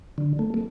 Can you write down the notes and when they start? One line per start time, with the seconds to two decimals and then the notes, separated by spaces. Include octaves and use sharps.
0.18 D3
0.39 A3
0.54 A3